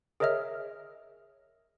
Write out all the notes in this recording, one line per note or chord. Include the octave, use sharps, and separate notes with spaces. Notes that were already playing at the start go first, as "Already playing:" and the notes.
G#4 A#4 C#5 D#5 E5 F6